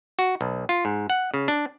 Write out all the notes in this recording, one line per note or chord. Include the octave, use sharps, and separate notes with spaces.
F#4
B1
F4
G#2
F#5
C#3
D4